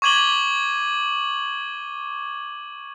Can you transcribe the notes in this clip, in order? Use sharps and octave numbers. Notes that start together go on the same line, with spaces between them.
C#6 D6 G#6 D#7 F#7 G7